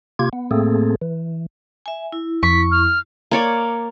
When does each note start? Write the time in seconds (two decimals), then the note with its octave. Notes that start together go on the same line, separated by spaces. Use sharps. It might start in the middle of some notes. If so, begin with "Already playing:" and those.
0.19 C3 A#3 F4 G4 G#6
0.33 B3
0.51 A2 A3 A#3 C4 G#4 A4
1.02 E3
1.86 E5 G#5
2.12 E4
2.43 F2 C#6 B6
2.71 F6
3.31 A#3 C#5 D5